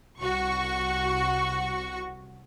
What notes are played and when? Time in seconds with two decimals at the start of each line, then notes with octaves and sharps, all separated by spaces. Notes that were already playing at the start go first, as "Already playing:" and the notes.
0.21 C2 F#4 C#6